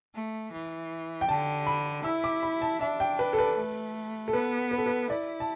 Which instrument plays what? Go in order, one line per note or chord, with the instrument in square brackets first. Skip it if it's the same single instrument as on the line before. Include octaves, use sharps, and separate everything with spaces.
[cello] A3
E3
[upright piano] G5
[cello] D3 [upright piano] A5
[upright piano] B5
[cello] E4 [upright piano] E6
[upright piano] D6
B5
A5
[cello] D4 [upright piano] E5
[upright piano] G5
B4
A4
B4
[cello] A3
[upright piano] A4
[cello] B3 [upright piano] B4
[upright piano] B4
A4
B4
[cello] E4 [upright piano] D5
[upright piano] A5